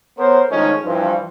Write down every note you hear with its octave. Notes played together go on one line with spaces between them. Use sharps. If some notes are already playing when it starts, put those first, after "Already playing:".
B3 A#4 C5 C#5
D#3 F3 G#3 A3 C#4 D#4
G2 E3 F3